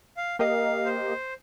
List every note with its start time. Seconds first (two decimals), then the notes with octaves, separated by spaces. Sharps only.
0.17 F5
0.39 A#3 G4 A#4 D#5 F5
0.85 C5